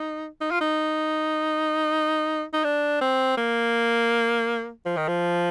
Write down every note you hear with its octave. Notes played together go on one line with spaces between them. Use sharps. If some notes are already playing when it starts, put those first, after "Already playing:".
Already playing: D#4
D#4
F4
D#4
D#4
D4
C4
A#3
F3
D#3
F3